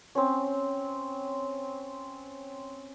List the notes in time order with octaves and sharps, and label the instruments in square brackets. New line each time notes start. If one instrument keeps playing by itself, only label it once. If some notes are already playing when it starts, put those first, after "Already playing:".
[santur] C4 C#4